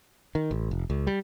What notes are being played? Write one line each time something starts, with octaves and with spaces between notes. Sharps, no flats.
D#3
A1
F1
C#2
G3